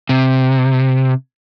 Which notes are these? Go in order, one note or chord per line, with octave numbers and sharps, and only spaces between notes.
C3